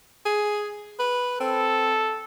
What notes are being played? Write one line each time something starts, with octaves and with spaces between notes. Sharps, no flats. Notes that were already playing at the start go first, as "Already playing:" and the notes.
G#4
B4
C4 A4